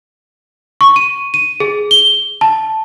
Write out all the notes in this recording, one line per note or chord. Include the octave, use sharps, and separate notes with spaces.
C#6
D#7
D#7
G#4
G7
A5